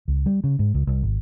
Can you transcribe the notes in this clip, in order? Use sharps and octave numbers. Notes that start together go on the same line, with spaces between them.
C#2
G3
C#3
G#2
C#2
C2
G#1